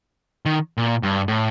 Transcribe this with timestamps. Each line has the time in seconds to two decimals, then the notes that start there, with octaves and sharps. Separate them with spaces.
0.46 D#3
0.78 A#2
1.03 G2
1.28 A2